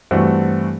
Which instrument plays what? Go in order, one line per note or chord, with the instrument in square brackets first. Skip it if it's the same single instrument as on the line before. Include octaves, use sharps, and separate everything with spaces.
[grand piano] G2 E3 A3 C4 F#4